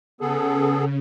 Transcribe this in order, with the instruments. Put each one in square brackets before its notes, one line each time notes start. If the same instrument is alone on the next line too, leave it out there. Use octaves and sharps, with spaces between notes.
[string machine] C#3 [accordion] B3 G#4 A4